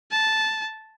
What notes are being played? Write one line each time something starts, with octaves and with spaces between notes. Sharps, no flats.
A5